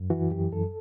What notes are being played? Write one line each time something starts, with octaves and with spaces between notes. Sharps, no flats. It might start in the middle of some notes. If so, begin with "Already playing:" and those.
Already playing: F#2
E3 F#4
F#2 G4
F#2 A4